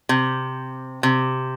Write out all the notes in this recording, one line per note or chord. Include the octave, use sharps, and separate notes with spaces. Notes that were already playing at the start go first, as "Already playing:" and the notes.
C3
C3